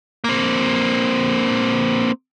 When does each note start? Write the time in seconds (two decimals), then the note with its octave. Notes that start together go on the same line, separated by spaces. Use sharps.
0.24 A#3 C4